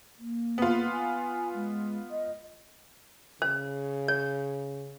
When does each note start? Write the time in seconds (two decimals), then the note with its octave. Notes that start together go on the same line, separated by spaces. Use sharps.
0.19 A#3
0.58 B3 F4
0.90 G#5
1.54 G#3
2.11 D#5
3.42 C#3 C5
4.08 C#5